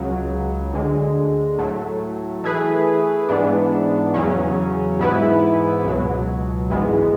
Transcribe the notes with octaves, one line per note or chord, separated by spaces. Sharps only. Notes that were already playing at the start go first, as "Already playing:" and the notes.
Already playing: C#2 C#3 F#3
D2 D3 G#3
A2 F#3 A3
E3 A3 E4 G#4 B4
G#2 E3 B3 D4
E2 C#3 F#3 C#4
G#2 E3 B3 E4 B4
C#2 B2 F#3
A1 G#2 E3 G#3 B3